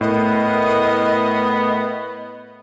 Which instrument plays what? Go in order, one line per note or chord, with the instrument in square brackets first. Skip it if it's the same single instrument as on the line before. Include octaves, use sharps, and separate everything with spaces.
[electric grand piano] A2 [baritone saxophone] B3 [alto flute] A#4 [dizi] D#5